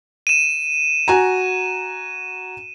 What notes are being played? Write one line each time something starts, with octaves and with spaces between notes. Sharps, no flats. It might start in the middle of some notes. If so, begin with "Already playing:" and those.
D#7 E7
F#4 G#5 A#5